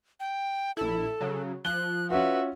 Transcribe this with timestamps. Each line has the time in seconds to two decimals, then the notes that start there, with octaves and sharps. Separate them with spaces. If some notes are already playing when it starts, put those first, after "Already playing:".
0.20 G5
0.77 A#1 E4 A4
1.21 C#3 F#3
1.65 F3 F#6 G7
2.10 C#4 F4 F#4 B4 E5